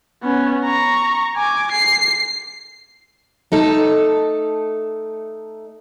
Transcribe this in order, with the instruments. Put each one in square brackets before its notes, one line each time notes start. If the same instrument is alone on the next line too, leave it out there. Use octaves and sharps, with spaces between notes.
[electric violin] B3 C#4
A#5 C#6
G#5 D6
C7
[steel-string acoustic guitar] A3 D#4 A4